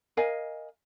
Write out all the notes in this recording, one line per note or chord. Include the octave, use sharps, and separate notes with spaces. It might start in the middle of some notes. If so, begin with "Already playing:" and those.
A#4 D#5 F5 G#5